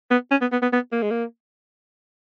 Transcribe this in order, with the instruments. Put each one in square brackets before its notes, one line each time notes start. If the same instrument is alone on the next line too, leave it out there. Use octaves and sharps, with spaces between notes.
[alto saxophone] B3
C#4
B3
B3
B3
B3
A#3
G#3
A#3